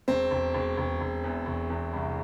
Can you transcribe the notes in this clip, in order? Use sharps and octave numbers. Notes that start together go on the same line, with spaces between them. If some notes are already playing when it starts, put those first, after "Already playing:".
E1 C4
E1
E1
E1
E1
E2
E1
E2
C2